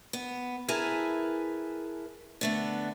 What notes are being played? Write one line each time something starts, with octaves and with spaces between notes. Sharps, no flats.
B3
E4 G#4 A#4 B4 G#5 A5
D3 A3 B3